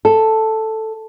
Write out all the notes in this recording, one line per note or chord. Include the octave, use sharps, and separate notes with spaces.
A4